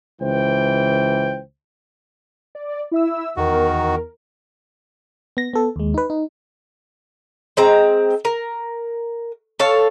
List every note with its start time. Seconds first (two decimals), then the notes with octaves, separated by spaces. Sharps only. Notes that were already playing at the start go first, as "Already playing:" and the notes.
0.21 C#2 E3 C5 G5
2.55 D5
2.91 E4 E5 E6
3.37 E2 D#3 F#4 A#4
5.37 B3 A#6
5.53 B3 A4
5.76 D#2 G#3
5.94 D#4 B4
6.10 D#4
7.57 G#3 C4 A#5
8.25 A#4
9.60 A4 C#5 F5